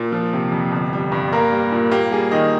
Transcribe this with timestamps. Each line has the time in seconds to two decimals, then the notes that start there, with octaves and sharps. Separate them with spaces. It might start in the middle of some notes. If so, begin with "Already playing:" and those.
Already playing: A#2
0.12 F3
0.33 C3
0.52 F2
0.72 G1
0.93 G3
1.12 G2
1.32 A#3 A#4
1.52 G3
1.72 A#2
1.91 A#3 G4
2.11 G3 G#4
2.31 D#3 D#5